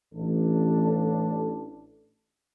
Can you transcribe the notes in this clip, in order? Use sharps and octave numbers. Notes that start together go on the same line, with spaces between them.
A1 D4 A4